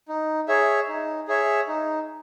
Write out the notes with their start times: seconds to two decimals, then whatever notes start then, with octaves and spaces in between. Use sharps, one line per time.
0.08 D#4
0.48 G#4 C#5 E5
0.88 D#4
1.28 G#4 C#5 E5
1.67 D#4